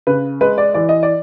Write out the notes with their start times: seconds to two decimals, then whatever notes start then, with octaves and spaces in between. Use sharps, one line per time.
0.07 C#3 B4
0.41 G#3 B4
0.58 D5
0.74 E3 D5
0.89 D#5
1.03 D5